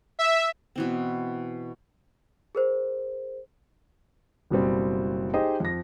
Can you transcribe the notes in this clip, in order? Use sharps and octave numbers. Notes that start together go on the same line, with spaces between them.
E5
B2 E3 C4
G#4 A#4 C5
F#1 B2 G3 C4
D#4 G4 G#4 C5 D#5
F2 A#6